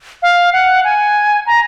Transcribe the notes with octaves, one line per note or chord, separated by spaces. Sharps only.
F5
F#5
G#5
A#5